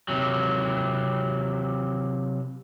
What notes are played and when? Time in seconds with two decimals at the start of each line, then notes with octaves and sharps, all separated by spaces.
0.08 C3 F#3